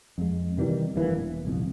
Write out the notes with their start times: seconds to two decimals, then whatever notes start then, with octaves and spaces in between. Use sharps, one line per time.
0.18 F2 G#3
0.57 C3 D#3 E3 G3
0.94 F1 G2 E3 A#3
1.19 E1
1.45 D#1 C2 F2